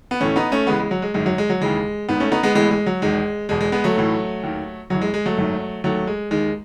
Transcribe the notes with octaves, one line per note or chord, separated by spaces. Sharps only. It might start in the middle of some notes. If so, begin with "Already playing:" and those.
B3
A1 A2 E3 A3 C#4
B3 D#4
A3 C#4
C#2 C#3 E3 G#3 B3
G#3
F#3
G#3
G#1 F#2 D#3 G#3
F#3
G#3
F#3
D#2 C#3 E3 G#3
G#1 G#2 D#3 B3
A3 C#4
B3 D#4
G#3 B3
A1 A2 E3 G#3 B3
G#3
F#3
E1 E2 D#3 G#3
E1 E2 B2 G#3
G#3
G#3 B3
F#3 A3
B1 A2 E3
D#2 D#3
F#1 F#2 E3 F#3
G#3
G#3
F#3 A3
G#1 F#2 D#3
D#2 D#3 F#3 A3
G#3
D#2 D#3 G#3